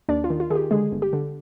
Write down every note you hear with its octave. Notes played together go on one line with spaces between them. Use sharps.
D#2 D4 D5
F4
D#3
F4
D#3 G#4
G4
D3 G#3 G#4
G1
G4
D3